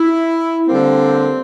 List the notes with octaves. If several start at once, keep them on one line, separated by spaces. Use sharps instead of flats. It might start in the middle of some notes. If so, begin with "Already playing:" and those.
Already playing: E4
D3 G3 A#3 C4